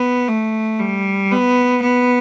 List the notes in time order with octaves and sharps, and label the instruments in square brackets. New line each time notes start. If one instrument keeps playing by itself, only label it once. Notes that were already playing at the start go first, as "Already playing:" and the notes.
Already playing: [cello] B3
A3
G3
B3
B3